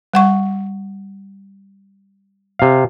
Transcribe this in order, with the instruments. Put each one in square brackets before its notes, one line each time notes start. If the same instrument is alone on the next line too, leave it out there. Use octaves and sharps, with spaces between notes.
[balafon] G3 F#5 C#6
[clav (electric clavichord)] C3 F5